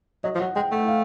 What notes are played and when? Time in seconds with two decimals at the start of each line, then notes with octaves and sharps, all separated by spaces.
0.24 F#3 D#5
0.35 F3
0.39 F#3 F#5
0.56 G#3 G5
0.71 A3 F#5
0.88 F5